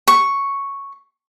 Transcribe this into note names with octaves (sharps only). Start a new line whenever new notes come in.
C#6